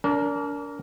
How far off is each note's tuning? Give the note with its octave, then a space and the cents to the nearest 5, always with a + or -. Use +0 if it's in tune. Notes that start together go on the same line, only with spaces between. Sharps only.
D4 -35 A#4 +0